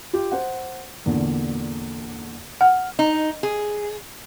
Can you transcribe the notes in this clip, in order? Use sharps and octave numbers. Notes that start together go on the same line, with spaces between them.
F4 G4
C5 F#5
E2 A#2 D3
F#5 F6
D#4
G#4